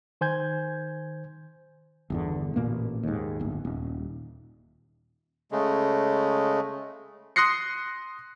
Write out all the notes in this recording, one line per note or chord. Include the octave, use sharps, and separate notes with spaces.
D#3 C5 G#5 G6 G#6
G1 E2 D3
A1 A#2 A#3
D#2 G#2
D1 G1
D#1
C#3 G#3 A3
C6 D#6 F#6 A#6 C7 C#7